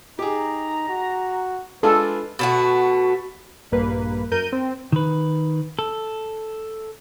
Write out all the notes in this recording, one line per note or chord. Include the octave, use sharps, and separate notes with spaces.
D#4 G4 G#4 A#5
F#4
G#3 D4 F4 A4 B4
B2 A3 F#4
A#1 G2 A#3 B4
F#2 A#4 G6 D#7
C4
D#3 B4
A4